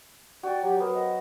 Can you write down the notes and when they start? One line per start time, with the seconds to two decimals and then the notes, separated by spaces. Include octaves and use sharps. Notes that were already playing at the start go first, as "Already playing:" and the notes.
0.43 F#4 D5 G5
0.63 F#3 G4
0.80 B3 A#4 C5
0.94 D#5